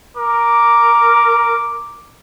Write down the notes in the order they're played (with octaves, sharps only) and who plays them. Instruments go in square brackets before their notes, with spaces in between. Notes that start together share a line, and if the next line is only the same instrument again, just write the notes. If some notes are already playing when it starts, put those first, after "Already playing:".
[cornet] A#4 [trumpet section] D6